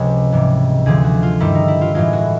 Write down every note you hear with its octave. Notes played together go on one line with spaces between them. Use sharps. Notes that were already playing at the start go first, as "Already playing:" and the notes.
Already playing: C#2 C3 F3 G#3 C#5
G#2 E3 G3
D2 D3 F3 G#4
F#4
F4
G2 D#3 G3 E4
D#4
E4
F4
A2 E3 G#3 F4
F#4